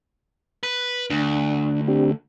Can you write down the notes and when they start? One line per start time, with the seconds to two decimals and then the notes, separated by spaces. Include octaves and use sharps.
0.63 B4
1.10 D2 D4
1.88 C4 D4 G4